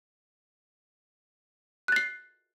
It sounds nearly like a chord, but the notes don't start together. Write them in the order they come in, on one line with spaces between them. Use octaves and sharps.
F#6 A6 C7